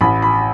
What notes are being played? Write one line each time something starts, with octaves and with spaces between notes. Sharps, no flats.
A1 B5
B5